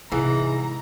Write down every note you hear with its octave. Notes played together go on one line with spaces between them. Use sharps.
G#2 C3 E3 G#3 A#5